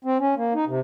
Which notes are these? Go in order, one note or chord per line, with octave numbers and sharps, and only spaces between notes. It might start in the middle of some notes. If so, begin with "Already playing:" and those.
C4
C#4
A#3
D#4
C3